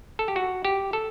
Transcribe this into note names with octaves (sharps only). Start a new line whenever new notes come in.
A4
G4
F#4
G4
A4